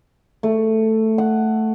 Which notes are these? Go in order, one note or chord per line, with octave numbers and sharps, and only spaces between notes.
A3
F#5